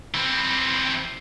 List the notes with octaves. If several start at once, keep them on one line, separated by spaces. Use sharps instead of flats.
E3 C4